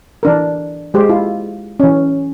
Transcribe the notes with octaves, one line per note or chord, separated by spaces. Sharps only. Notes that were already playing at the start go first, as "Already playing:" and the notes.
E3 D4 A#4
G#3 G4 C5
E4 F4
E3 C#4